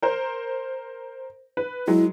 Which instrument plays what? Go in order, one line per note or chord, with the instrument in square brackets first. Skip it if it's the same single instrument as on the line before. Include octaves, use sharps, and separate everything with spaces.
[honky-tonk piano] A#4 C5
B4
[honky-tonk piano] F#3 G#3 [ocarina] E4